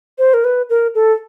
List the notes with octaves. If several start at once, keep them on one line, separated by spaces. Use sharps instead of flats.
C5
A#4
B4
A#4
A4